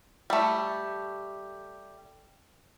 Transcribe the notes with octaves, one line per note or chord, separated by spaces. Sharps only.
G3 A3